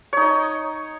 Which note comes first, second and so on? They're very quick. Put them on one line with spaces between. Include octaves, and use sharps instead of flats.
C#5 D#4 D#5